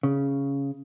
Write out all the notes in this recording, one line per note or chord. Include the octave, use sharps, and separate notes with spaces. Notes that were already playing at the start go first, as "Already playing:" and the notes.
C#3